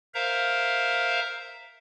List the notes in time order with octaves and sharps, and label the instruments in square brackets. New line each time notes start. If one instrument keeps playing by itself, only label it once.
[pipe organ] A#4 C5 E5 F5 A#5